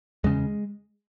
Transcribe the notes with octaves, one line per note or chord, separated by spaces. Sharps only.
E2 C#3 G#3